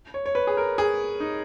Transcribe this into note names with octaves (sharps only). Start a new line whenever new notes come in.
C#5
C#5
B4
G#4
A#4
G#4
D#4